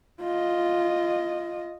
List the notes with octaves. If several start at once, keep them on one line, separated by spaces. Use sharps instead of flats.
F4 D#5